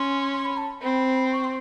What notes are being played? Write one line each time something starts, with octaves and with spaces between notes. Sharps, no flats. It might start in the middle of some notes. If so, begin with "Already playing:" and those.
Already playing: C#4 C6
C6
B5
A5
C4 B5
C#6
C6